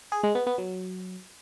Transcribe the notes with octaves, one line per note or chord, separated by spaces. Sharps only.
G#4
G#3
B3
B3
F#3